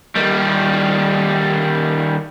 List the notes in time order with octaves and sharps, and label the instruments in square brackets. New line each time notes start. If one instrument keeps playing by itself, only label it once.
[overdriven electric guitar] D#3 G3